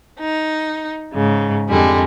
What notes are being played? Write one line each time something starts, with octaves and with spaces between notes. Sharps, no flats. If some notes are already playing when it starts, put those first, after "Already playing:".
D#4
G#2 C#3
F2 D3 G3 G#3